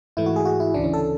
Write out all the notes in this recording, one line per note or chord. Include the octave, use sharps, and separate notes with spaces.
G#2 E3 A3 E4
F#4
G#4
F#4
E4
D2 C#3 E3 D4
C#4
A4